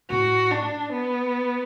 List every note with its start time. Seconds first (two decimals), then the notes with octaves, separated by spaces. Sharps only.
0.10 A2 F#4
0.51 D4
0.92 B3